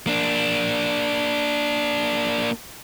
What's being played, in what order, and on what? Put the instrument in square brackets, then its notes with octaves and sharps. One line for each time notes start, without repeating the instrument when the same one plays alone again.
[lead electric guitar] A#3 D4